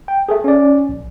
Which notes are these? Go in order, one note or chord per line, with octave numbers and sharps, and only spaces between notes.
G5
G#4 A4 E5
C#4 D5
A#1